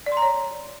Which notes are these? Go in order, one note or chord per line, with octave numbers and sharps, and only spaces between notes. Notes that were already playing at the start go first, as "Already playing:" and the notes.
D5
C6
A#5
C#5